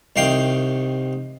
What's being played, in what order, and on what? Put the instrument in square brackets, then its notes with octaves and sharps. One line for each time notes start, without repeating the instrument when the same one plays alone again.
[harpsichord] C2 D#3 F5 G5